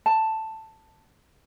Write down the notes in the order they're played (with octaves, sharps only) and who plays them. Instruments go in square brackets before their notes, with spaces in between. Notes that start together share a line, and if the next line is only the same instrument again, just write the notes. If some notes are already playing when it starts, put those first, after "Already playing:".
[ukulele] A5